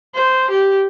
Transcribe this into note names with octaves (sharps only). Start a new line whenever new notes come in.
C5
G4